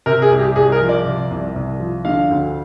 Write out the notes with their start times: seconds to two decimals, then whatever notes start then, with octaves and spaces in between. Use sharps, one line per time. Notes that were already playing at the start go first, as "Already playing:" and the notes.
0.06 C3 A#4
0.22 G#4
0.31 C2
0.39 G4
0.56 C2 G#4
0.72 A#4
0.81 F3
0.89 D5
1.05 C3
1.31 C2
1.56 C2
1.80 F3
2.05 D3 F5
2.31 D2